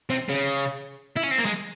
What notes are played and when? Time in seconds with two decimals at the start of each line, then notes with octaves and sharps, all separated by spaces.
0.10 C3
0.29 C#3
1.16 E4
1.23 C#4
1.31 C4
1.38 A#3
1.45 G#3